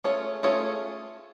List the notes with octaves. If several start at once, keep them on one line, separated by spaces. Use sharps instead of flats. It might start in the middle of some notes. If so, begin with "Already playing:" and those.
A3 C#4 F4 G#4 C#5
A3 C#4 F4 G#4 C#5